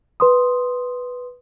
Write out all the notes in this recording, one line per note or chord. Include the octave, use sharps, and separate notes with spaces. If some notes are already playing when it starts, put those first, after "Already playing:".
B4 C6 D#6